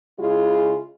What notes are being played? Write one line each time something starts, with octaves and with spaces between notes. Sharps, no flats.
C#3 G#3 E4 F4 G#4